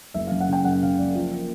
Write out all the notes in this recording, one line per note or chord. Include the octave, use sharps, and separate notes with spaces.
F#1 E5
F5
F#2
F#5
C#3 G5
F#2 F#5
C#3 F5
F#1 D5
F3
A#3